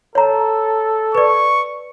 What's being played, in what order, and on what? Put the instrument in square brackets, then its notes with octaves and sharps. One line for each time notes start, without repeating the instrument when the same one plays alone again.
[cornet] A4 [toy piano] C#5 A#5
[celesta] B4 D5 [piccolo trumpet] C#6